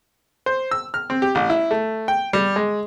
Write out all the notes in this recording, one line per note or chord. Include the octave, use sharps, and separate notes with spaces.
C5
E6
F6
C4
G4
A1
E4
A3
G5
G3
G#3